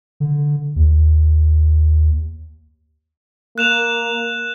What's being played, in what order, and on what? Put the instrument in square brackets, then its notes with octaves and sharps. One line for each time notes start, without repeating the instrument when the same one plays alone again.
[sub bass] D3
D#2
[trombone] A#3 [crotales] F#6 E7 F7